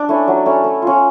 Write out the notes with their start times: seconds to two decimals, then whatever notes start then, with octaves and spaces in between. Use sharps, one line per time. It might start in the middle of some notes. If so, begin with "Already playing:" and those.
Already playing: D4 D5
0.09 A3 C#4 E4
0.28 F#3
0.46 A3 C#4 E4
0.64 A3
0.82 C#4 F4